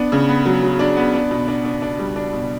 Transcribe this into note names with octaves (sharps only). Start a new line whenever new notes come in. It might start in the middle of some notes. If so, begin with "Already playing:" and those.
Already playing: B3 D4
C#3
B3
F#3
F#3
D4
B3
D4
B2
D4
D4
D4
G3
D4
B2